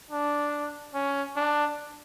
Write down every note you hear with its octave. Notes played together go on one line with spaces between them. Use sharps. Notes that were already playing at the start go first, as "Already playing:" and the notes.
D4
C#4
D4